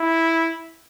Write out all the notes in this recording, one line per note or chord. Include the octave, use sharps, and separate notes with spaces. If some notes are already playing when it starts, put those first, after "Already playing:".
Already playing: E4